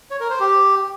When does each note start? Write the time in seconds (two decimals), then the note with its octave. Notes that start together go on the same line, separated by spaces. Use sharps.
0.11 C#5
0.20 A#4
0.30 C5
0.40 G4